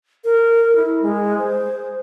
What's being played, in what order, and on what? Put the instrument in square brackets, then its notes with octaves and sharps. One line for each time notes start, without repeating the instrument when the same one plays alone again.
[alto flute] A#4
E4
G#3
C5